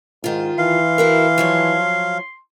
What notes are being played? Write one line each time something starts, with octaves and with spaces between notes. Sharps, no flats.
G#2 D#3 F4
E3 F5 C6
E4 F#4 A#4
F3 F#3 C#5